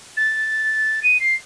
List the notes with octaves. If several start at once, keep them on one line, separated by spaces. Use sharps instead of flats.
A6
D#7
C7